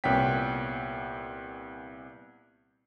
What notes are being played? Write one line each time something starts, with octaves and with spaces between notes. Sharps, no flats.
C2 A#2 B3 C#5 G5 B6